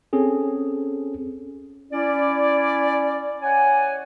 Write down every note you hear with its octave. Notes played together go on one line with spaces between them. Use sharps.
C4 C#4 G#4 A4
C#4 E4 D5
C#5 D5 F#5 G#5